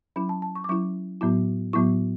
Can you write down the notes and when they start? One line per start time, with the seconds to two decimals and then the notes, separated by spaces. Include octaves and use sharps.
0.16 F#3 C#4 E4 B5
0.29 A5
0.42 A5
0.55 C#6
0.64 D6
0.69 F#3 C#4 E4 C#6
1.21 A2 F#3 B3 E4
1.73 A2 F#3 B3 E4 C#6